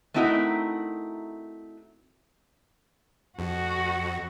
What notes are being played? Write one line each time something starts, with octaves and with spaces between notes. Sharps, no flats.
A3 C4 D#4 E4 F#4 A#4
F2 F#4